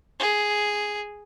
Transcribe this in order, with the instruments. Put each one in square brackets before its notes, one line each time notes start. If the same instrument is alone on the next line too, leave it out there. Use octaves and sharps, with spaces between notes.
[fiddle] G#4